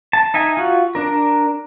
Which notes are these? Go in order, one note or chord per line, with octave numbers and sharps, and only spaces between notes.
A5
D#4 E5 G#5
F4 F#4
D4 A#4